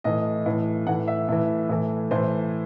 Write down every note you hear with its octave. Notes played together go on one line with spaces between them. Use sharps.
A2 E3 D#5
A2 E3
A2 E3 F#5
E5
A2 E3
A2 E3
A2 E3 C5